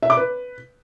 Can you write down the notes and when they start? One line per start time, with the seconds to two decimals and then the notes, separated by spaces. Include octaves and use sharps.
0.03 E5
0.10 D6
0.17 B4